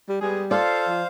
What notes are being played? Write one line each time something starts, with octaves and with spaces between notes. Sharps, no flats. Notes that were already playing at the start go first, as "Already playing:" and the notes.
G3
G3 G#3 B3 G#4
F4 A4 C5 D5 F5
F3